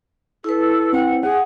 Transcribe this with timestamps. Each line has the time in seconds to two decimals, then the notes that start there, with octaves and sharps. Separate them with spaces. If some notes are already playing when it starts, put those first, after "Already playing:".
0.44 E4 A4 B4
0.93 C4 F#5
1.23 G#4 F#5